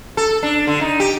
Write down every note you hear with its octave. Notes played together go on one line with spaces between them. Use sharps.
A4
D4
D3
D#4
G4